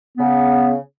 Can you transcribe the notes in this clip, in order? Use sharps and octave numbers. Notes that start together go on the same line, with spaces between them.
C#3 B3